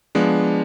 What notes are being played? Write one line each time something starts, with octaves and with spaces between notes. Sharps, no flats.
F3 G#3 B3 D4